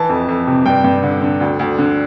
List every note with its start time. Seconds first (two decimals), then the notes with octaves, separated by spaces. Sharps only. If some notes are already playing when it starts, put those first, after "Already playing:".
Already playing: E3 A5
0.09 F2
0.28 F2
0.47 C3
0.66 G2 G5
0.84 G2
1.03 D3
1.22 D3
1.41 D2
1.59 D2
1.78 D3